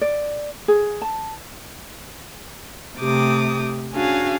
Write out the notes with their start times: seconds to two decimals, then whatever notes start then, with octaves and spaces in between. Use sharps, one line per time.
0.01 D5
0.68 G#4
1.02 A5
2.99 C3 A3 G4 D6 D#6
3.93 C#4 D4 F#4 G#4 F5